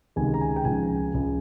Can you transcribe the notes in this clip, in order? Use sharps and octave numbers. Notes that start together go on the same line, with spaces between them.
C#2 C3 D#3 G#3 G#5
A#5
G#5
G5
C#2 C#3 F3 G#3 G#5
C#2 C#3 F3 G#3